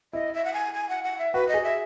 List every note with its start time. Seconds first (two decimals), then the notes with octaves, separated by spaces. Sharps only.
0.13 E4 D#5
0.34 E5
0.45 F#5
0.54 G#5
0.74 G#5
0.89 F#5
1.04 F#5
1.18 E5
1.34 F#4 B4
1.48 D#5
1.54 G#4
1.64 E5